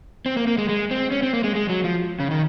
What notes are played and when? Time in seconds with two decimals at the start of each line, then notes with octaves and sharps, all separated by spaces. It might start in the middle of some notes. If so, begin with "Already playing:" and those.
0.26 C4
0.37 A#3
0.47 A#3
0.58 G#3
0.69 G#3
0.91 C4
1.11 C#4
1.23 C4
1.33 A#3
1.44 G#3
1.55 G#3
1.69 F#3
1.84 F3
2.20 C#3
2.31 D#3